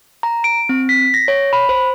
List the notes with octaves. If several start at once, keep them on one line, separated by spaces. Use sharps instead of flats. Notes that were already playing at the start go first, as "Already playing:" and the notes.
A#5
D7
C4
B6
A#6
C#5
B5
C5